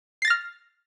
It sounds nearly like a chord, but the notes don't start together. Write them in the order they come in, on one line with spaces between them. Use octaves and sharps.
C7 A6 A#6 F6